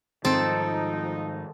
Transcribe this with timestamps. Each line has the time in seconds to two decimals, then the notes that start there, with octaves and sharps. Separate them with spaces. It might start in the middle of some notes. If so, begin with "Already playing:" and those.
0.25 G#2 D#3 F3 G3 C4 D#4 A4